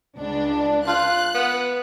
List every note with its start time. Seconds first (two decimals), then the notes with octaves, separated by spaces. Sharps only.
0.17 C#2 D4
0.87 F4 F#6
1.35 B3